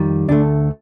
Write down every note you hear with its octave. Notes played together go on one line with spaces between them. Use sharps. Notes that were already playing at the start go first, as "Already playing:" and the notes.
Already playing: F2 D#3 G3
D2 D3 A3 D4